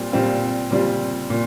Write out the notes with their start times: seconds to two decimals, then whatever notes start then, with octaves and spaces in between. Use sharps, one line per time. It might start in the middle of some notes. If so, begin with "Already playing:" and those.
Already playing: A#2 G3 C4 F4
0.12 A#2 G3 C4 F4
0.71 A#2 G3 C4 F4
1.30 A#2